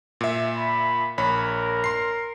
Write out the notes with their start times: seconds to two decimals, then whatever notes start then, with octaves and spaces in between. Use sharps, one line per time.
0.21 A#2 E5
0.57 B5
1.18 A#1 A#4 C#5 B5
1.84 C6 C7